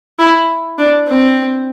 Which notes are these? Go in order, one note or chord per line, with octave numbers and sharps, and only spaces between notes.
E4
D4
C4